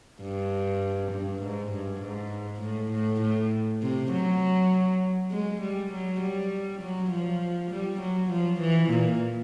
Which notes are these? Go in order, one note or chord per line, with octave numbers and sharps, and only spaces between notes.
G2
G2
G#2
G2
G#2
A2
A2
A2
C3
F#3
G#3
G3
F#3
G3
F#3
F3
G3
F#3
F3
E3
A#2